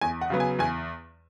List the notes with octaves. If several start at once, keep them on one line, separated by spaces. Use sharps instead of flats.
E2 G#5
F#5
C#3 F#3 B3
G#5
E2 G#5